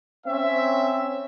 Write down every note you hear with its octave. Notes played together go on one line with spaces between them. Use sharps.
C4 C#4 E5